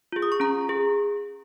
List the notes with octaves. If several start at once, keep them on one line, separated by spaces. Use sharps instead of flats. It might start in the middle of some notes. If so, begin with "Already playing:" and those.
F4 G#4
D#6
C#6
C#4 A#5
G#4